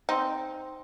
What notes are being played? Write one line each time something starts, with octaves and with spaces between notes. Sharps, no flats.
C4 D#4